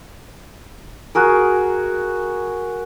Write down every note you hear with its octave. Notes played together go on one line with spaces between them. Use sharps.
F#4 G#4 A#4